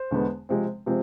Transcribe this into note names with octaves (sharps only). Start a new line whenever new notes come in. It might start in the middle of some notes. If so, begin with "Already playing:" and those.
Already playing: C5
E2 D3 G#3 B3
C3 F3 G#3 C4
C3 F3 G#3 C4